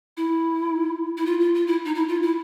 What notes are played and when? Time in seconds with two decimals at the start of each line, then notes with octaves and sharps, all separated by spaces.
0.17 E4
1.17 E4
1.26 F4
1.40 F4
1.55 F4
1.67 E4
1.85 D#4
1.95 E4
2.08 F4
2.22 E4